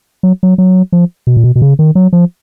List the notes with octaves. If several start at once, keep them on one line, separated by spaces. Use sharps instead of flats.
F#3
F#3
F#3
F3
B2
A#2
B2
B2
C#3
D#3
F#3
F3